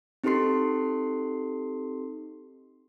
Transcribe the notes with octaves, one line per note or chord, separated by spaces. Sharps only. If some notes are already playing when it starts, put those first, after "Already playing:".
C4 D#4 G4 A4 C6 C7